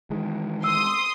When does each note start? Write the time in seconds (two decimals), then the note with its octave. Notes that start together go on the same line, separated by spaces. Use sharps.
0.10 D#3 E3 G#3
0.64 C6 D#6 E6